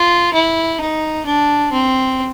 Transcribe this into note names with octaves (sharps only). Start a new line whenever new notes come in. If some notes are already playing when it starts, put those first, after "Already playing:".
Already playing: F4
E4
D#4
D4
C4